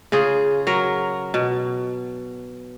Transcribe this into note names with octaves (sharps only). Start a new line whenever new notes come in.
C#3 F4 G#4
F#3 A#4
B2